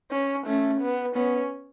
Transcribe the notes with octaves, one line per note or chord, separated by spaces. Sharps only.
C#4
A3 C#4
B3
B3 C#4